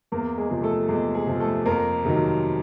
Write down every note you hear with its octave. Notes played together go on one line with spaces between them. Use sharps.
E2 A#3 A#4
G#3 G#4
C3 F3
A3 A4
E2 G#3 G#4
G#3 G#4
C3 F3
A3 A4
F2 A#3 A#4
C3 D#3 F#3